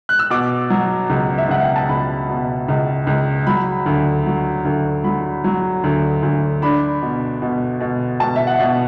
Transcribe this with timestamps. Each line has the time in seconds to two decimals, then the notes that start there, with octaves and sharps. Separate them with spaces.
0.09 F#6
0.19 E6
0.30 B2 D6
0.70 F#3
1.10 C#2
1.38 E5
1.49 C#2 F#5
1.63 G5
1.76 A5
1.89 C#2 B5
2.29 B2
2.68 C#2
3.07 C#2
3.47 F#3 B5
3.86 D2
4.26 F#3
4.65 D2
5.04 F#3 B5
5.44 F#3
5.84 D2
6.23 D2
6.62 D4 B5
7.02 B2
7.42 B2
7.80 B2
8.20 B2 A5
8.36 E5
8.47 F#5
8.59 B2